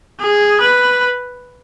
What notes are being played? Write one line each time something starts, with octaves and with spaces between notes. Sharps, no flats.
G#4
B4